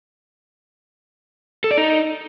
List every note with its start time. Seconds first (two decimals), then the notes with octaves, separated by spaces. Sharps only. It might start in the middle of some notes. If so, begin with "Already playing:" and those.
1.64 A4
1.71 D5
1.77 D#4